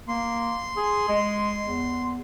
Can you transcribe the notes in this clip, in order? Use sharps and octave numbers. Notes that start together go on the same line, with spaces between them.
A#3 C6
G#4
G#3
E2